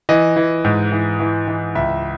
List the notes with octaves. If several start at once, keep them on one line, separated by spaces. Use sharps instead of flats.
E3 D#5
E3
G#2
E3
E3
E3
C#2 E5